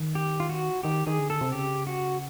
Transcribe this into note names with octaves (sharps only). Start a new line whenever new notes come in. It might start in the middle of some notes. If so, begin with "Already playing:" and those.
Already playing: D#3
G4
F4
F#4
D#3 G4
D#3 G#4
D3
A4
C3
C#3 G4
F#4